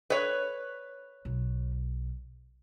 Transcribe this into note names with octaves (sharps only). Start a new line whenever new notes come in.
B4 C#5
B1